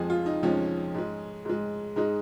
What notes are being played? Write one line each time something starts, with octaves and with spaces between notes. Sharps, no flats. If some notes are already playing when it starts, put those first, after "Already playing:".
Already playing: F2 F3 G#3 G#4
F4
D#4
F2 F3 G#3 C#4
G#2 G#3
G#2 G#3
G#2 G#3 D#4